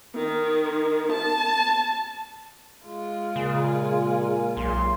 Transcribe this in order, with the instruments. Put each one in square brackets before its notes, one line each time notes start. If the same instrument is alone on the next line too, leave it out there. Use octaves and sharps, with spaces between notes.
[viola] D#3
A5
G#3 F4
[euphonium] A#2 [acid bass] C#3 [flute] G#5
[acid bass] B1 [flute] C6